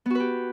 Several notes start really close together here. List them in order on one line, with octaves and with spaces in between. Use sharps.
B3 F#4 B4 G4